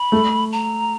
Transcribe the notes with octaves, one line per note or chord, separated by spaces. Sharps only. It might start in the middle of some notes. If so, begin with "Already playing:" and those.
Already playing: B5
A3
A#5